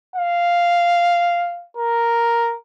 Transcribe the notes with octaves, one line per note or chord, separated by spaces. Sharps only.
F5
A#4